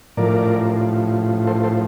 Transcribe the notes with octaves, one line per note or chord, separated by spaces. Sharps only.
A2 F3 A#4 D5
A4 C5
A4 C5